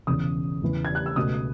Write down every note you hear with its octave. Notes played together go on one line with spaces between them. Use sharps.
E1 E2 C#3 D#6
E2 C#3 E3
G#6
F#6
E6
C#2 B2 A3 D#6